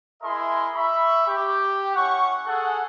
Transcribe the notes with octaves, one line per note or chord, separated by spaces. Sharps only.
E4 G#4 A#4 D#5 E5 C6
E5 B5 C#6
G4
C#4 E4 F#5 C#6
G#4 A4 F#5